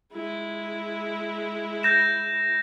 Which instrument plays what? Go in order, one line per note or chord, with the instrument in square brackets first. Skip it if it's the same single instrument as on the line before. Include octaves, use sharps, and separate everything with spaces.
[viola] G#3 E4
[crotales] G6 A#6 E7